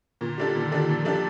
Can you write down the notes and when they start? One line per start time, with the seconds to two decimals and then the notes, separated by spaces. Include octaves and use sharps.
0.21 A#2 D3
0.38 G3 D4 A4
0.55 A#2 D#3
0.72 G3 D4 A4
0.89 A#2 F3
1.05 G3 D4 A4